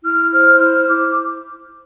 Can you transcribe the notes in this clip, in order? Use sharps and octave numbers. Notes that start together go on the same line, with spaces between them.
E4 F6
C5 F6
E4 F6
E4 D6